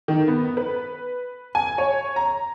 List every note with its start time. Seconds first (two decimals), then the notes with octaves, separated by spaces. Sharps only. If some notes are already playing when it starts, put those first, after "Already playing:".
0.08 D#3
0.28 B3
0.57 B4
1.55 G#5
1.78 C#5
2.16 A#5